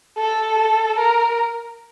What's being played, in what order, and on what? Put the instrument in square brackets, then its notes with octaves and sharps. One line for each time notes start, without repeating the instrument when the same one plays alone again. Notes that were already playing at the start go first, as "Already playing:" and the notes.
[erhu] A4
A4
A#4